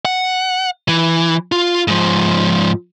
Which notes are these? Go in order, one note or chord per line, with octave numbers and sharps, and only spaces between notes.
F#5
E3
F4
G#2 F3